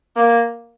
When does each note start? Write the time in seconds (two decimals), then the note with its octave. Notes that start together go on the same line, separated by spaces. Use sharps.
0.16 A#3